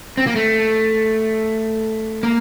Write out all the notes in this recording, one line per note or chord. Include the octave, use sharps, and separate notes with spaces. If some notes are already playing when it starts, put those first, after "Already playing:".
C4
A#3
A3
A#3